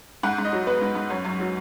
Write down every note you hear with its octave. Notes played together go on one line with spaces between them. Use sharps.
G#2 F#5
G#2
D#5
F#3
B3 B4
G#2
G#2
F#2 C#5
F#2
F#3